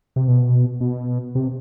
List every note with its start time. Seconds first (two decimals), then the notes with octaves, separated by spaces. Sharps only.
0.16 C3
0.28 B2
0.81 B2
1.35 C3